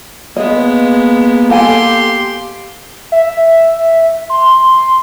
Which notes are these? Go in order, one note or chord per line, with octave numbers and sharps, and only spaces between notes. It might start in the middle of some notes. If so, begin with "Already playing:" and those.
G#3 A#3 B3 D#5
G4 A4 F5 G#5 C6
E5
C6